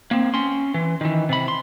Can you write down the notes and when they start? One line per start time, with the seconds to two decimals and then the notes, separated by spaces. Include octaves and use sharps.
0.11 A#3 C4
0.34 C#4 C6
0.74 E3
1.01 D#3 E3
1.29 C3 B5
1.48 C6